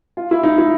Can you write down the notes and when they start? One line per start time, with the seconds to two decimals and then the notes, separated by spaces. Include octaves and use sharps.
0.17 F4
0.31 E4
0.43 D#4
0.58 E4